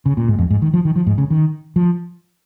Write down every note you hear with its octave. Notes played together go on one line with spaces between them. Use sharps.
C#3
A#2
G#2
F2
G#2
D#3
F3
D#3
F3
G#2
C#3
D#3
F3